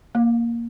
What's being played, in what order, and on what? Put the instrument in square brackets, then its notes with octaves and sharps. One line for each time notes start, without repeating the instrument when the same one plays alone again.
[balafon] A#3